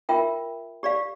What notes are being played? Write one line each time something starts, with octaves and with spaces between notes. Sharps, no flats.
F4 A#4 E5 G5
G4 D5 F5